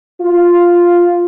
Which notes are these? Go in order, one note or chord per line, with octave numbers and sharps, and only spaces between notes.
F4